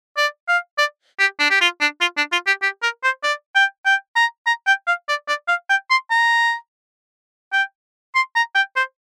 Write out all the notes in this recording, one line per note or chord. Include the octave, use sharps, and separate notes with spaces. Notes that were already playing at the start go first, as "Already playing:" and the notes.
D5
F5
D5
G4
D4
G4
F4
D4
F4
D4
F4
G4
G4
A#4
C5
D5
G5
G5
A#5
A#5
G5
F5
D5
D5
F5
G5
C6
A#5
G5
C6
A#5
G5
C5